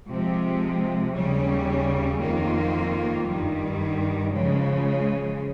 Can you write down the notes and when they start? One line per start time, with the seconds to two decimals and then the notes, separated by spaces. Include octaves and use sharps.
0.08 C3 F3 G#3
1.15 D#2 C#3 G3 C#4
2.21 F2 D#3 A#3 F4
3.27 G2 D#3 G3
4.33 C#3 F3 G#3